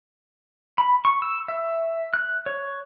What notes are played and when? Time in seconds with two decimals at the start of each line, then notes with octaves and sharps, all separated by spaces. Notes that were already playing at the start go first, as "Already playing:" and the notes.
0.78 B5
1.05 C#6
1.22 E6
1.48 E5
2.14 F#6
2.46 C#5